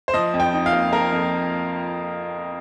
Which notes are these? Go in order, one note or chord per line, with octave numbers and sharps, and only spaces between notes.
C5
F3 D#5
F2
G5
D#4
F5
A#3
F3 A#4
F2